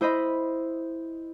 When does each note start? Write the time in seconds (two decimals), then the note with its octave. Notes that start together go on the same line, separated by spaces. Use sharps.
0.01 E4 C5 D#5 B5